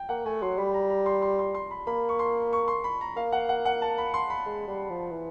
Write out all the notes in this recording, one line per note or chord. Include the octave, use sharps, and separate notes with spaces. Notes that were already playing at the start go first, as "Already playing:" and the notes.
Already playing: G5
A#3 F#5
A3 G#5
F#3 C6
G3 B5
A#5
A#5
C6
C6
C6
C6
B5
A#3 B5
C#6
C6
C#6
C6
B5
A#5
A#3 F5
F#5
F#5
F#5
A5
B5
C6
B5
G#3
G3
F3
E3